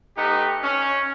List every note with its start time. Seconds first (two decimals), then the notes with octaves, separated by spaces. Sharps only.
0.16 A3 B3 D#4 G4
0.63 C#4